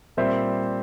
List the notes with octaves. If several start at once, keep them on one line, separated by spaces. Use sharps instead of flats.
A#2 G3 C4 C5 E5